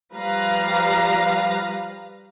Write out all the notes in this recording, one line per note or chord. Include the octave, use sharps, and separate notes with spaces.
F3 G3 B4 F5 A#5